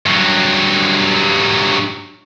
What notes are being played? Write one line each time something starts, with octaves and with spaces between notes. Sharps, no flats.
G2 F#3